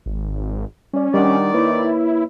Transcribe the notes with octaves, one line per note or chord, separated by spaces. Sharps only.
G#1
G3 C#4 D5
D#3 G3 D4 D5 F#5
A#3 E4 B4 C#5